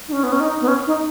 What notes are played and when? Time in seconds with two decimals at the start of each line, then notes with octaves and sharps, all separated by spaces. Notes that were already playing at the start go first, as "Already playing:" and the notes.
0.08 D#4
0.12 C#4
0.23 B3
0.32 C#4
0.40 D#4
0.61 B3
0.68 C#4
0.87 D#4